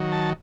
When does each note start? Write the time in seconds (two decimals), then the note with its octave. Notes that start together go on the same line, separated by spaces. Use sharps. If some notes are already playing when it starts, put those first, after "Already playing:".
Already playing: D#3 F#3
0.12 A5